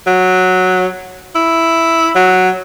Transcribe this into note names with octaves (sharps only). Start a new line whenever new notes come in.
F#3
E4
F#3